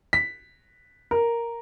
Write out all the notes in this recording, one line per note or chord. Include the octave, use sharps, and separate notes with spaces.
B6
A#4